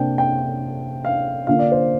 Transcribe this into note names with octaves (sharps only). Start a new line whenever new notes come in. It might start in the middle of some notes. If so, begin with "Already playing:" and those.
Already playing: C3 A#3 D4 G5
G5
F5
D3 A#3 F4 F5
D5
C5